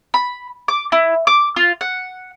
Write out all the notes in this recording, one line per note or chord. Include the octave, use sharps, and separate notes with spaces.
B5
D6
E4
D6
F4
F#5